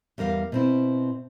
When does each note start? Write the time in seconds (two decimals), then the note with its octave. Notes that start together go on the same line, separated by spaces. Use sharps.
0.18 E2 G3 A#4 F5
0.52 B2 C4 E4